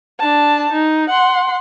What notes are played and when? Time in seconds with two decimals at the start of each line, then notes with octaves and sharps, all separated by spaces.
0.20 D4 A5
0.72 D#4
1.10 F#5 C6